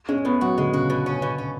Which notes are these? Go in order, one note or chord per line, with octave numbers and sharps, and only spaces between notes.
G#3 C#4
A2 B3
F#3 F#4
D3 G#3
C#3 F#4
B2
C#4
B2
C#4